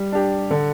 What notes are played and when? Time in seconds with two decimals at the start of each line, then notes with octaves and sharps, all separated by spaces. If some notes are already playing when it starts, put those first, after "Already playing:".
Already playing: G3
0.12 D4 G4
0.51 D3